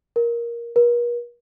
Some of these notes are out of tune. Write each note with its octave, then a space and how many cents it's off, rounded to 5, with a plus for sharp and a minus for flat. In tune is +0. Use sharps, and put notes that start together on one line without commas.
A#4 +10
A#4 +45